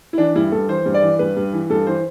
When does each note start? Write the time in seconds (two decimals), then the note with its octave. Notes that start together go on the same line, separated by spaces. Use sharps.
0.13 E4
0.18 E3 D4
0.35 G2 E4
0.52 G2 A4
0.68 E3 C5
0.86 G2
0.94 D5
1.02 E3
1.19 G2 B4
1.37 G2
1.53 E3
1.70 G2 A4
1.87 E3 C5